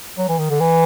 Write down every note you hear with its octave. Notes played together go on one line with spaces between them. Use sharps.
F#3
E3
D#3
D3
E3